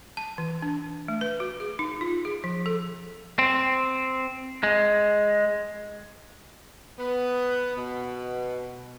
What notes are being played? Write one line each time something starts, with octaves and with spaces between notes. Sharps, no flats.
A5
E3
D4
A3
B4
F#4
G#4
D#4
F4
G#4
F3
A4
C4
G#3
B3
B2